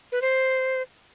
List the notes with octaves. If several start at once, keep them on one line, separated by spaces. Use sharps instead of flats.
B4
C5